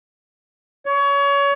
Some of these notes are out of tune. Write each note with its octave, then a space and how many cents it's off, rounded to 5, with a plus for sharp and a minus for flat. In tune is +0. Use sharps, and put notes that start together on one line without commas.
C#5 +25